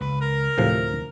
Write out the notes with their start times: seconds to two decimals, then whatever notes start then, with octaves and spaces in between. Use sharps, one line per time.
0.01 C#2 B4
0.21 A#4
0.58 D2 A2 C3 F3